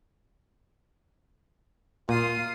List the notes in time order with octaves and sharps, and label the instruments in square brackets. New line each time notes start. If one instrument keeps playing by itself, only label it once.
[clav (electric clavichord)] A#2 [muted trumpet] F4 [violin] D#6 C7